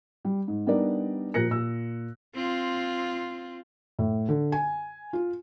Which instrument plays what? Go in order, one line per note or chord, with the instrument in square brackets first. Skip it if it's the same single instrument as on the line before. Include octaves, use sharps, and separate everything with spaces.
[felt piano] G3
G#2
G3 B3 D4 D#4 A#4 D5
A#2 F3 A#4 F#6 A#6 C#7
A#2 E6
[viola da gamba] C4 F4
[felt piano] A2
D3
G#5
F4